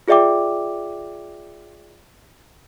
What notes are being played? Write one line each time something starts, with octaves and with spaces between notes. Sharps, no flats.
F4 G#4 D5 E5 G5 D6